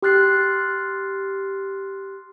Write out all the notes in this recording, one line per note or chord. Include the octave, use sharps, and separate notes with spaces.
G4 C6 F6 F#6 A6 C7